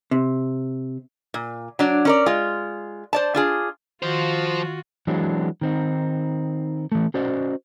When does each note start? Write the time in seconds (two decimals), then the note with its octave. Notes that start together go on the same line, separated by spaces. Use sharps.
0.11 C3
1.34 A#2
1.79 F#3 D4
2.05 C#4 A#4 D5
2.26 G#3 F4
3.13 C5 D5 A5
3.35 D4 F4 G#4
4.03 D#3 F3 F4 F#4 C5
5.07 E3 F#3 G#3 C4 D4 F#4
5.61 D#3 C4 D#4
6.92 E3 A3
7.14 C#4 F#4 C5 D5 D#5